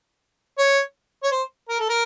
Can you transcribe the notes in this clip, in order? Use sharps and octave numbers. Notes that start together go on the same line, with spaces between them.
C#5
C#5
C5
A#4
A4
A#4